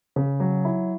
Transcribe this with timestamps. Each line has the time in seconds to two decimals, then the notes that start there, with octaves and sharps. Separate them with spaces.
0.16 C#3
0.40 F#3
0.65 E4